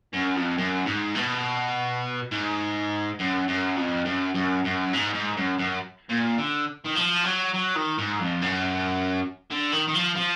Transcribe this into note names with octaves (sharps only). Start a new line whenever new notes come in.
F#2
F2
F#2
G#2
B2
G#2
F#2
F#2
F2
F#2
F#2
F#2
G#2
G#2
F#2
F#2
A#2
D3
D#3
F3
F#3
F#3
D#3
G#2
F2
F#2
D3
D#3
D#3
F3
F3